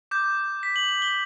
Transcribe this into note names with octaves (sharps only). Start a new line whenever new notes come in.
D6 G6
B6
F#7
F#7
G7